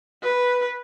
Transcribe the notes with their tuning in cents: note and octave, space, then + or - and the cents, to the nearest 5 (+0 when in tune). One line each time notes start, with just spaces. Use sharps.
B4 -5